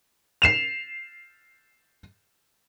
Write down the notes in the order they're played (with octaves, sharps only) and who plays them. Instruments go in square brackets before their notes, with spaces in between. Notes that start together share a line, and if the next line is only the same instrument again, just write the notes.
[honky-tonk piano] C7 E7 F7